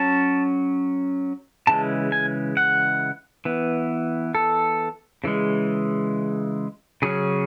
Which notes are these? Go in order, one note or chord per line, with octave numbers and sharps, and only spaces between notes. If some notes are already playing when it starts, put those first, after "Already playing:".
Already playing: F#3 C#4 A5
C#3 E3 G#3 A5
G#5
F#5
E3 B3
A4
C#3 E3 G#3
C#3 F#3 C#4 G#4